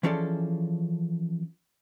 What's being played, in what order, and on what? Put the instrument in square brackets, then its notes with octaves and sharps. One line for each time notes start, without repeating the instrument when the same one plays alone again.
[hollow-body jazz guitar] E3 F3 C#4 G#4 A4 D5